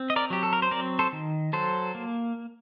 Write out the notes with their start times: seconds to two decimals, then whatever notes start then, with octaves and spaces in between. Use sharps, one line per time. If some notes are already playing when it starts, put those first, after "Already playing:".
Already playing: C4
0.10 D#5
0.16 A#4 D5
0.30 F#3 G4
0.43 A4
0.53 A#4
0.62 C5
0.71 C4 A#4 D5
0.99 A4 C5
1.13 D#3
1.53 F#3 A4 C5
1.95 A#3